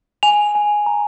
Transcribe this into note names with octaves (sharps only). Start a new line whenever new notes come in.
G#5 F7
G#5
A#5